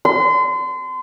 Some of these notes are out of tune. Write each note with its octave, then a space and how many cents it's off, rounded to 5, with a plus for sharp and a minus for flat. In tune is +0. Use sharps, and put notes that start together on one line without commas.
C6 -35